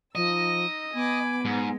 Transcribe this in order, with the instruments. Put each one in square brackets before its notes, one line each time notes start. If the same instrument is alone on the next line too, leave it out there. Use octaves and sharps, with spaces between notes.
[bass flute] F3 [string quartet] D#4 E6 [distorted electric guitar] D#5
[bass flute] B3 [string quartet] G#5 B5 D6
[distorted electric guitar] G#2 [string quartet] G#3